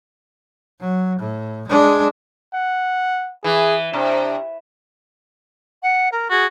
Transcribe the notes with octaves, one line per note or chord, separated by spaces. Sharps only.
F#3
A2
G#3 D4
F#5
E3 G#4
C3 D4
F#5
A#4
F#4 G#4